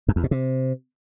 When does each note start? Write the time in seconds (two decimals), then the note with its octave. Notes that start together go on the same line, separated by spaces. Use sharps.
0.08 F#2
0.16 E2
0.24 B2
0.31 C3